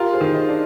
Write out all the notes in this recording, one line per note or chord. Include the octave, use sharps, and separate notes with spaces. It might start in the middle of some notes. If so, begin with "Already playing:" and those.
Already playing: F4 G4 A#4
G#4 C5
D#3
C5 D#5
D4